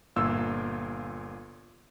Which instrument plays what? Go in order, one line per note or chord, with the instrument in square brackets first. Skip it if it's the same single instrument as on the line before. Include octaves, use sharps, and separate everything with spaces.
[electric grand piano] G1 A#2 F4 E6